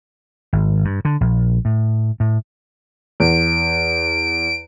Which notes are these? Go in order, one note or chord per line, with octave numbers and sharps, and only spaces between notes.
G#1
G2
D3
A#1
A2
A2
E2 D7